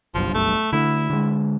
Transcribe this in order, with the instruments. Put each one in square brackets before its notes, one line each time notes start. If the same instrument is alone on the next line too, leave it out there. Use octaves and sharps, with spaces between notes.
[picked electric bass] F#1 B1 G2 [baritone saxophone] F3
[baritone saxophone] A3
[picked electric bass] D3 A3 [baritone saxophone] E4
[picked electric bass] D3 G#3